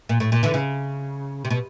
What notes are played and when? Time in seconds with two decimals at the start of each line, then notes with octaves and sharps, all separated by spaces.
0.09 A#2
0.20 A2
0.32 A#2
0.43 D3 E3
0.54 C#3
1.45 C3
1.50 B2